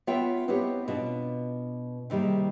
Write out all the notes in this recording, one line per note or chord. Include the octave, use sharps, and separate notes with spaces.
B3 F4 C#5 E5 G5
B3 C4 D#4 E4 G4 C#5
B2 D4 F4
C3 D#3 G3 A#3 G#4